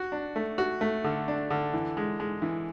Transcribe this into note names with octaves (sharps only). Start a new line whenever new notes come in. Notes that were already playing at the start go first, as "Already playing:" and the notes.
Already playing: F#4
D4
A3
F#4
A3
D3
D4
D3
E3
G#3
G#3
E3